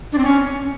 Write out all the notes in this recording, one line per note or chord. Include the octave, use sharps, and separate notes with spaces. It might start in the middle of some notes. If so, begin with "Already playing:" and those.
D4
C4
C#4